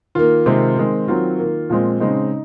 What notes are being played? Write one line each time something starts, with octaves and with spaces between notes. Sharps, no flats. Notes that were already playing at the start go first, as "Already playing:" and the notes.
D#3 A#3 F4
C3 D#3 G#3 C4
D#3 G#3 C4
D#3 F#3 C4 F4
D#3 A#3
A#2 F3 G#3 C4
C#3 G#3 C4 D#4